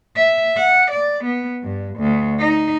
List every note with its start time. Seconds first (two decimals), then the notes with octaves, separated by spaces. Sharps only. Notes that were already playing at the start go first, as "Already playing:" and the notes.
0.16 E5
0.57 F#5
0.91 D5
1.24 B3
1.63 G2
1.98 D2
2.39 D#4